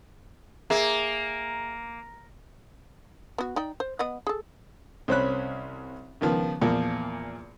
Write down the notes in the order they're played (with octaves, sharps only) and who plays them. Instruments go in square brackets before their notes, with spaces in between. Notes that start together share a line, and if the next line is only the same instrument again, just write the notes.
[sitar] A#3 [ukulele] G#4 E5
[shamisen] B3 F#4
D#4 D5 G5
C5
B3 D#5 F#5
G#4 A4
[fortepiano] C2 C#4 C5 C#5 B5 F#6
C#2 D#3 F3 B3
E2 A#2 F3 A#4